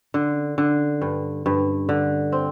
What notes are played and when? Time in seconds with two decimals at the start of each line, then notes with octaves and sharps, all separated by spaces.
0.14 D3
0.58 D3
1.02 G2
1.46 G2
1.89 D3
2.32 C4